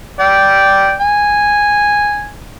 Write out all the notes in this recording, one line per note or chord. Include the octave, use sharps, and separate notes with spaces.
D5 G5
G#5